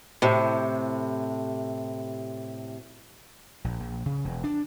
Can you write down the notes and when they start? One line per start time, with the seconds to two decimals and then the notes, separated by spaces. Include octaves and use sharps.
0.22 A2 C3
3.64 A#1
3.80 A#1
4.06 C#3
4.25 E1
4.44 D4